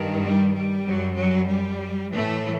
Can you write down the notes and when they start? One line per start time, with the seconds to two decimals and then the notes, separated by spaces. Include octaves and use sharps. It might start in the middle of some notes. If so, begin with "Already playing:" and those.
Already playing: G2 D#3
0.23 G3
0.55 G3
0.87 F#2 F#3
1.18 F#3
1.50 G3
2.14 A2 E3 A3